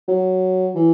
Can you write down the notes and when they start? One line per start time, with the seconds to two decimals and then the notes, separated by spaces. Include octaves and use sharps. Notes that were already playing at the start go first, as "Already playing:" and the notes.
0.08 F#3
0.75 E3